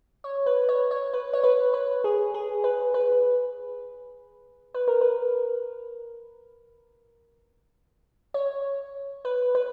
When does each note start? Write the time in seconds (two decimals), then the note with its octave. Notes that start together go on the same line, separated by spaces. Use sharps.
0.24 C#5
0.46 B4
0.69 C#5
0.91 C#5
1.14 B4
1.33 C#5
1.44 B4
1.74 B4
2.04 G#4
2.34 G#4
2.64 B4
2.94 B4
4.75 B4
4.88 A#4
5.01 B4
8.34 C#5
9.25 B4
9.55 B4